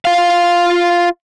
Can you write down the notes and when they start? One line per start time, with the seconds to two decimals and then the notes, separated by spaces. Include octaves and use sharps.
0.05 F4 F5